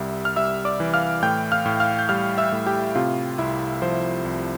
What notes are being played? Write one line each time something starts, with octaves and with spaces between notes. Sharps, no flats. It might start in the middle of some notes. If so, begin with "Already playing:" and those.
Already playing: C2 G3 E5
F6
G3 E5 E6
D5 D6
E3
F5 F6
A2 G5 G6
F5 F6
A2
F5 F6
G6
G3 F5 F6
E5 E6
A2
G4 G5
C3 F4 F5
C2 E4 E5
F3 C5
C2